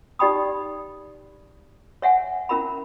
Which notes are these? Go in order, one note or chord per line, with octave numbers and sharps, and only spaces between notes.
D#4 G4 D5 G5 B5 D#6
C#5 E5 F#5 G#5
C#4 E4 A#4 E5 B5